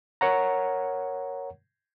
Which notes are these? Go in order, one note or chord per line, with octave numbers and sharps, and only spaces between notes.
A#4 C#5 F#5 A#5